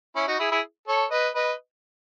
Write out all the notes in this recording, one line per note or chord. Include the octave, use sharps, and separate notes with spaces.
C#4 E4
D#4 F#4
E4 G#4
E4 G#4
A4 C#5
B4 D#5
B4 D#5